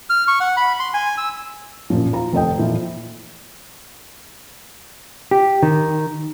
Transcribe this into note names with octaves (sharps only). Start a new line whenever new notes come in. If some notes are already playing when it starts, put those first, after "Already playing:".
F6
C#6
F#5
B5
C6
G#5
E6
F#2 A#2 F3
F4 A#5
F1 F2 A4 D#5 G5
A#2 E3 F3
G4
D#3